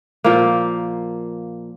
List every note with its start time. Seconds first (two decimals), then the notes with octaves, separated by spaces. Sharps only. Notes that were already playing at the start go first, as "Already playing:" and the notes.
0.24 A#2 F3 A#3